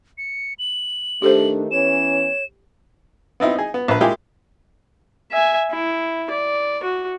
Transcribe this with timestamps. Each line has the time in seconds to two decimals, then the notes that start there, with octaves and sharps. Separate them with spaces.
0.18 C#7
0.59 F#7
1.22 D#3 A3 D4 G4 A4 C5
1.71 E3 B3 C#4 C#5 E7
3.40 B3 C4 D#4 E4
3.56 D#4 G#4
3.74 B3
3.88 A#1 B4
4.01 G#3 A#3 E4 F4 G4 G#4
5.31 E5 G#5
5.71 E4
6.30 D5
6.83 F#4